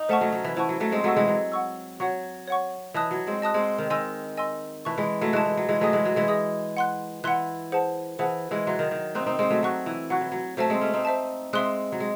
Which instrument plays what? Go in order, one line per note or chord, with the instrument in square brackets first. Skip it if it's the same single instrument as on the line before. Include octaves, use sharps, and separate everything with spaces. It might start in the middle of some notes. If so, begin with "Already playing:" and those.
Already playing: [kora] D#4
[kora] A3 C#4 [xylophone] C5 F#5 A5 C#6
[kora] F#3 A3
F#3
E3
[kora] E3 [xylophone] C5 F#5 A5 C#6
[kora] F#3
F#3 A3
G#3 C4
[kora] F#3 A3 [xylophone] F#5 C#6 E6
[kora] E3 G#3
F#3
[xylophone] F#5 C#6 E6
[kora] F#3 [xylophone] C#5 F#5 C#6
[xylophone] C#5 F#5 C#6
[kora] E3 [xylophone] D#5 A5 D#6 F#6
[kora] F#3
G#3 C4
[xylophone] D#5 A5 D#6 F#6
[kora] G#3 C4
D#3
[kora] D#3 [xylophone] D#5 G#5 C6 E6
[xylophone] D#5 G#5 C6 E6
[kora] E3 [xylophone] E5 A5 C#6 F#6
[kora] E3 G#3
F#3 A3
[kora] E3 G#3 [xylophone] E5 A5 C#6 F#6
[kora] E3
F#3
E3 G#3
[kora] F#3 A3 [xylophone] G#4 D#5 G#5 D#6
[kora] E3 G#3
F#3
E3 G#3
[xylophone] G#4 D#5 G#5 D#6
F#5 C6 F#6
[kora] E3 [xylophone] F#5 C6 F#6
[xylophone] G#4 C5 F#5 A5
[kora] E3 [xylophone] G#4 C5 F#5 A5
[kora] E3 G#3
[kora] F#3 [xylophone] E5 C6 F#6
[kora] D#3
D#3
[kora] C4 D#4 [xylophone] E5 C6 F#6
[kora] C4 D#4
G#3 C4
F#3 A3
[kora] F#3 [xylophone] F#5 C#6 F#6
[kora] E3
[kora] F#3 [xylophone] F#5 C#6 F#6
[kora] E3
F#3
[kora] F#3 A3 [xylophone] C5 E5 A5
[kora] G#3 C4
A3 C#4
C4 D#4
[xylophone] C5 E5 A5
[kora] G#3 C4 [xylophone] E5 C6 D#6 F#6
[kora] F#3
G#3